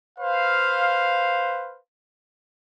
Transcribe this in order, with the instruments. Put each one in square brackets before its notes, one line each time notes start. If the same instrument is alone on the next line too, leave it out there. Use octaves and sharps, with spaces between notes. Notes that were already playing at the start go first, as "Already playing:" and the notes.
[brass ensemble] B4 C5 F5